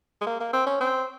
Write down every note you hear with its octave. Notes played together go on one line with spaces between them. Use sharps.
G#3
A#3
A#3
C4
C#4
C4